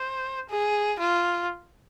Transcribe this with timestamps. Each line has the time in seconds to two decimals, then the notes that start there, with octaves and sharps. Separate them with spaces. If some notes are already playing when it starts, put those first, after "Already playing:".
Already playing: C5
0.50 G#4
1.00 F4